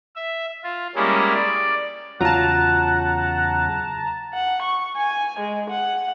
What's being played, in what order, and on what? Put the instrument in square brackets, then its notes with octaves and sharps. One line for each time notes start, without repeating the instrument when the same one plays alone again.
[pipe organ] E5
F4
G3 G#3 A#3 C#4 E4
D5
[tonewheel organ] E2 C#3 [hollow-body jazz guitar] F#3 F4 [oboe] F#5 [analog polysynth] A5 A#5
[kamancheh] F#5
C#6
G#5
G#3
F#5